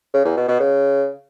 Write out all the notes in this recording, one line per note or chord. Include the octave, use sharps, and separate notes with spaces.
C#3
E2
B2
B2
C#3